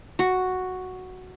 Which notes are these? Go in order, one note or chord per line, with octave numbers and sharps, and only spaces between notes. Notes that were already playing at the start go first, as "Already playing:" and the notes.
F#4